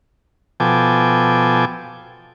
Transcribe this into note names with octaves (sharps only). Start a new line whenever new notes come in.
B2 F3 A4 G5 G#5 D6